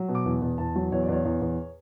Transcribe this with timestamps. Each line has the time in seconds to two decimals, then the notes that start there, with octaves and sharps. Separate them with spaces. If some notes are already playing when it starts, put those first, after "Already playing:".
Already playing: F#3
0.08 B2
0.15 D6
0.25 E2
0.42 E2
0.58 E2 A5
0.75 F#3
0.92 E2 C#5
1.02 D5
1.09 E2 C#5
1.25 E2
1.41 E2